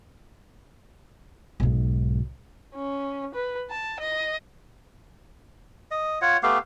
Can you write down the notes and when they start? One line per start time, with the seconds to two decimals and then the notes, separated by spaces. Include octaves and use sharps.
1.60 B1 G#2
2.75 C#4
3.34 B4
3.70 A5
3.99 D#5
5.91 D#5
6.21 F4 C#5 F#5
6.43 A3 B3 G4 F5